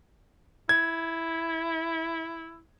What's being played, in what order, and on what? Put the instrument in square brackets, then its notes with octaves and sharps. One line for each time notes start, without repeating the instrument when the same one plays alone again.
[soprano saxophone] E4 [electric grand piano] G#6